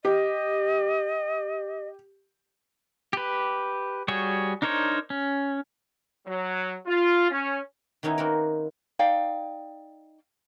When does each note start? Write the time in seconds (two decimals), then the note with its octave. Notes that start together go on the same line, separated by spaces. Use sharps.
0.05 G4 D#5
3.13 G4 B4
4.08 G3 F#4 G#4 C#5
4.62 D4 D#4 A#4 C5 C#5
5.10 C#4
6.27 F#3
6.87 F4
7.30 C#4
8.03 D#3 B3 C#4 D#4 E4
8.18 A#3 C4 F#4 A#4
8.99 D#4 D5 F5 G5